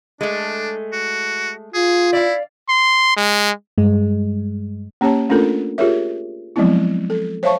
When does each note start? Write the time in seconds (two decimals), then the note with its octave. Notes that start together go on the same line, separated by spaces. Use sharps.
0.21 G#3 A3 D4
0.93 F#4
1.74 F4 G#4
2.13 E4 D5 F5
2.69 C6
3.17 G#3
3.78 G2 G#3
5.01 A#3 C#4 G4 C#5 A5
5.30 A3 C#4 D4 F4 A4 A#4
5.78 F4 G4 G#4 A#4 C#5 E5
6.56 F3 F#3 G#3 B3 C4 E4
7.10 A4
7.43 C5 C#5 E5 F5 A5 C#6